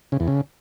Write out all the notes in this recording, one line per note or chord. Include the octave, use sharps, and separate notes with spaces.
C#3
E2
C#3